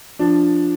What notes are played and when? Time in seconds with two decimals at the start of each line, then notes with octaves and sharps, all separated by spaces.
0.19 F3 D4